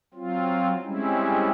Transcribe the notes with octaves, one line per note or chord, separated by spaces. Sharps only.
F#3 C4 F4
G3 G#3 C4 C#4 E4